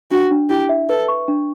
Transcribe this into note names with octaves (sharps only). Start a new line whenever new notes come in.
D4 F#4
D4
E4 G4
E5
A4 B4
C#6
D4